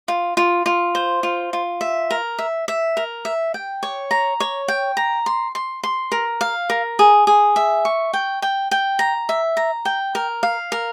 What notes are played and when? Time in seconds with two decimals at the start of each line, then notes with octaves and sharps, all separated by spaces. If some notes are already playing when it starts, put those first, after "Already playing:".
0.08 F4
0.37 F4
0.66 F4
0.95 C5
1.23 F4
1.53 F4
1.81 E5
2.11 A#4
2.39 E5
2.68 E5
2.97 A#4
3.25 E5
3.54 G5
3.83 C#5
4.11 A#5
4.40 C#5
4.68 G5
4.97 A#5
5.26 C6
5.55 C6
5.83 C6
6.12 A#4
6.41 F5
6.70 A#4
6.99 G#4
7.27 G#4
7.56 E5
7.85 C#6
8.13 G5
8.42 G5
8.71 G5
8.99 A#5
9.29 E5
9.57 A#5
9.85 G5
10.15 A#4
10.43 F5
10.72 A#4